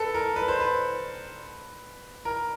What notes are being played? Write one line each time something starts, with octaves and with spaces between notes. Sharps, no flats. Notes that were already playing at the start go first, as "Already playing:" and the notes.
Already playing: A4 B4
A#4
B4
C5
B4
A#4